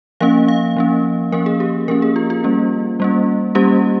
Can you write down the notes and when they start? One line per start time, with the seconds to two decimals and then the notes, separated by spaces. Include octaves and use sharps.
0.20 F3 A#3 C#4 F5
0.48 F5
0.77 F3 A#3 C#4
1.32 F3 A#3 C#4 A#4
1.46 G#4
1.60 G4
1.88 F3 A#3 C#4 A#4
2.02 G#4
2.16 F4
2.30 F4
2.44 G3 A#3 C#4
3.00 G3 A#3 C#4
3.55 G3 A#3 C#4 G4